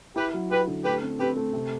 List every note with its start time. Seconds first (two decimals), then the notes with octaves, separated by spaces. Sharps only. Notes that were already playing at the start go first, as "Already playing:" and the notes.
0.16 E4 G4 B4
0.34 F#3
0.51 E4 G4 B4
0.67 D3
0.85 A3 G4 B4
1.02 C4
1.19 C4 G4 B4
1.37 A3
1.53 C3